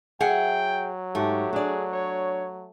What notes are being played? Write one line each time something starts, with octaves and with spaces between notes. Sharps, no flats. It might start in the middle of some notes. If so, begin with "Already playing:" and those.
F#3 G#4 E5 F#5 G5
G#2 A3 G4
D4 G#4 D5
C#5